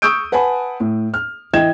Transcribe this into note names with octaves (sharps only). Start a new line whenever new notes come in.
C#6 D#6 E6 G6 D7
B4 F#5 G#5 A5 B5
A2
F6
E3 D#5 G5 G#6 E7